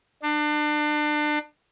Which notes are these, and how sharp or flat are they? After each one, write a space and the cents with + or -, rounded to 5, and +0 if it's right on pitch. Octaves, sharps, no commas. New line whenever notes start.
D4 +30